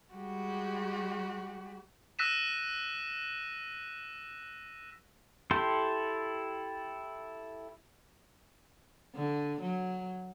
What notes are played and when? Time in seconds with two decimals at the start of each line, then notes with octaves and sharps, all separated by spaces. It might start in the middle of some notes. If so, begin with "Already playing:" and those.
0.15 G3 G#3 F#4 G4
2.19 E6 F#6 A#6 B6 D#7 E7
5.51 E4 G4 A4 C6
9.15 D3
9.61 F#3